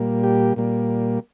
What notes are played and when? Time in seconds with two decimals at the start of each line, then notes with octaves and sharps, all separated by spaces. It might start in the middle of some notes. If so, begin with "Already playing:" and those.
Already playing: A#2 G3 A#3
0.24 G4
0.56 A#2 G3 A#3